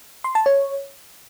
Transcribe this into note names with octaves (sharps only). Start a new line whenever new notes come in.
C6
A5
C#5